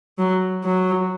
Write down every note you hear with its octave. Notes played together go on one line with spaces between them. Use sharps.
F#3
F#3